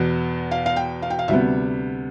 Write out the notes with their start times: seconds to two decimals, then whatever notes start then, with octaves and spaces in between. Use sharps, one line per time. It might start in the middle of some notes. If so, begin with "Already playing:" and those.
Already playing: E2 B2 B3
0.51 F5
0.66 F5
0.76 G5
1.02 F5
1.10 G5
1.19 F5
1.28 D2 C3 G3 B3 E5